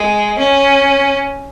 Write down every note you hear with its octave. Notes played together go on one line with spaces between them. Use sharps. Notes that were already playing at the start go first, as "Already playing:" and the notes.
Already playing: G#3
C#4